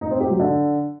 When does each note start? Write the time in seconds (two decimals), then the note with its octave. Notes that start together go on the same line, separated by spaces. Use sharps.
0.01 D#4
0.11 C4
0.20 G4
0.30 F#3
0.39 D3